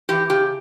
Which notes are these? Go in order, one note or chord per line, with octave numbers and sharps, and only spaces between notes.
E3 G4
C#3 G4